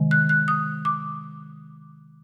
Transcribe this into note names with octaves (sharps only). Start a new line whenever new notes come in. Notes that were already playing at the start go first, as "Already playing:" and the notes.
Already playing: C3 D#3 G#3
F#6
F#6
D#6
D6